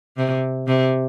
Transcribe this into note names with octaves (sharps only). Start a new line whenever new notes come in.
C3
C3